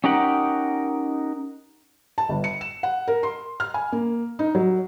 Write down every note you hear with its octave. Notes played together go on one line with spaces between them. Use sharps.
C#4 D#4 G4 A#4 F#5
A5
G1
C#7
E7
F#5
A#4
C6
F6
G#5
A#3
D#4
F#3